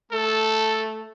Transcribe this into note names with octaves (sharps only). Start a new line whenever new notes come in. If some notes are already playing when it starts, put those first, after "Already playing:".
A3 A4